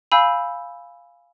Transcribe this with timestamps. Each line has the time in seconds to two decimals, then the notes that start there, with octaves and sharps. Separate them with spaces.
0.12 F5 G#5 B5 E6 G6